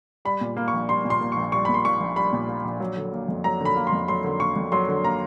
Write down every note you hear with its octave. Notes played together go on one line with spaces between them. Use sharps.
G3 B5
A#2
A#3
C#6
A#1
G3 C6
A#2
C6
A#3
C#6
A#1
G3 C#6
A#2 B5
C6
A#3 C#6
A#1
G3 B5
A#2
A#3
A#1
F#3
D3
A#3
F2
F#3 A#5
D3 B5
A#3
C6
F2
F#3 C6
D3
A#3 C#6
F2
F#3 C6
D3
A#3 A#5